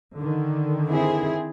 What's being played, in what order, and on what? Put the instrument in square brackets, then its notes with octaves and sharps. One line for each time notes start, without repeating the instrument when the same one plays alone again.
[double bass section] D3 D#3
[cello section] C4 E4 G#4